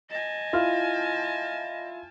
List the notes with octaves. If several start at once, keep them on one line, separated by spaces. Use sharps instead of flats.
D#5 G#5 A5
E4 F4 F6